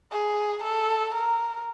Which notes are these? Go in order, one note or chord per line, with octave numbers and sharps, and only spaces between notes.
G#4
A4
A#4